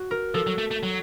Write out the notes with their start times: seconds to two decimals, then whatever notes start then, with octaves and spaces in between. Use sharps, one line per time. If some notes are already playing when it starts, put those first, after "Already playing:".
Already playing: F#4
0.11 A#4
0.34 F3 A4
0.47 F#3
0.58 A3
0.71 A3
0.83 F#3